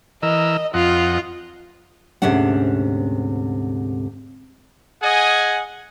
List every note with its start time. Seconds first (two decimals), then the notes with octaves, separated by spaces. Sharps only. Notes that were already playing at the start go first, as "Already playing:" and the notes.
0.23 E3 A#4 D#5 E6
0.74 F2 F4 D#5 F#5
2.22 D2 G#2 C3 C#4 D4 F#5
5.02 G#4 D#5 F#5 G#5